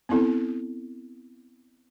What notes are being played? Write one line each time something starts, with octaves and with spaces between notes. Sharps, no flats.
B3 C4 E4 A4